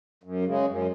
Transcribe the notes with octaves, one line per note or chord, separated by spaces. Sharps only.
F#2
C#3 G#3
F#2